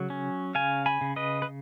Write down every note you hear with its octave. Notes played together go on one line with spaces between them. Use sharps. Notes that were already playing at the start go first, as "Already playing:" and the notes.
Already playing: C#3 F#3
C#4
C#3 F5 G#5
G#5 B5
C#3
B4 D#5
B4